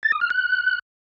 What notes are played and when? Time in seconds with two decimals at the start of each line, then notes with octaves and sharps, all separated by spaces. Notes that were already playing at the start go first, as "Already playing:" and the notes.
0.03 A6
0.12 D#6
0.21 F6
0.30 F#6